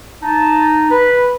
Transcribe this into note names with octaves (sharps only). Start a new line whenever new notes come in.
D#4 A5
B4 B5